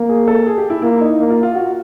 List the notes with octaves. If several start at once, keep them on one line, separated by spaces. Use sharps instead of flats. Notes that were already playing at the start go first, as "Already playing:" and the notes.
Already playing: A#3
G#4
A4
G#4
G4
E4
A#3 E4
D#4
A#3
F4
F4
F#4